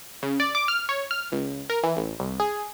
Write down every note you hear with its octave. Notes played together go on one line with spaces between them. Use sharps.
C#3
D5
D6
F6
C#5
F6
C#2
A#4
E3
A1
C2
G#4